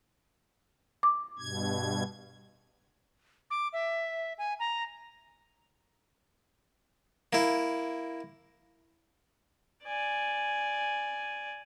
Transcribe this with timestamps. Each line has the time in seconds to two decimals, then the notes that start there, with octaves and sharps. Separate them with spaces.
1.03 D6
1.39 G2 B2 G#6
3.51 D6
3.73 E5
4.38 G#5
4.60 A#5
7.33 A#3 E4
9.84 D5 G#5